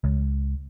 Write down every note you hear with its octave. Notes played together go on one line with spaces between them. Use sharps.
C#2